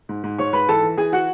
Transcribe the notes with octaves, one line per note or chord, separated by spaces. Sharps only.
G#2
G#2
G#2 C#5 C#6
G#2 B4 B5
E3 A4 A5
E3
E3 G#4 G#5
F#4 F#5